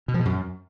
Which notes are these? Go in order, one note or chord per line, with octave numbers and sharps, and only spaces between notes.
B2
F3
B2
F#2